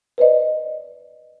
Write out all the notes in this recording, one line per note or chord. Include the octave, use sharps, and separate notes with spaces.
B4 C5 D5 D#5